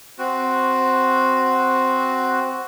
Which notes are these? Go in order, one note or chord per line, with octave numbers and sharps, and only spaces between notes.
C4 F#4